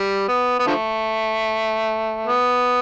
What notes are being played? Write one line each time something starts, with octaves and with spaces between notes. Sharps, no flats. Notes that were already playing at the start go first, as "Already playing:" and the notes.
Already playing: G3
B3
B3
D3 F3 A3
B3